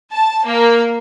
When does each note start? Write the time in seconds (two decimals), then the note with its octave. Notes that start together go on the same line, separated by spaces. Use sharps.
0.13 A5
0.46 A#3